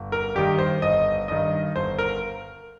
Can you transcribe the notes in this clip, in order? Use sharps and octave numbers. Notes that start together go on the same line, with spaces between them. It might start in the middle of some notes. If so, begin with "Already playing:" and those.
Already playing: G1
A#4
G2 D#3 G4
C5
G1 D#5
G2 D#3 D#5
G1 C5
A#4